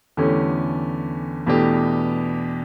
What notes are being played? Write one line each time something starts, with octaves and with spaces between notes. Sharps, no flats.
E2 D3 A3 C#4 G4
E2 B2 A3 D4 G4